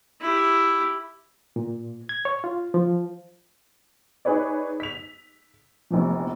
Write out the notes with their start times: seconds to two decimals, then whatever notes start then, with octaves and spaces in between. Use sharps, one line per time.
0.21 E4 G4
1.56 A#2
2.09 G#6
2.25 C#5
2.44 F4
2.74 F3
4.25 D#4 G#4 B4 C#5 D5
4.80 B6 F7
5.90 F1 A#1 E2 F3